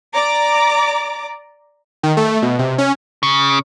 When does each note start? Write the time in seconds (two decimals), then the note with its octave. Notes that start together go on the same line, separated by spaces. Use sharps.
0.14 D5 A#5 D6
2.03 D#3
2.17 A3
2.42 B2
2.59 C3
2.78 C#4
3.23 C#3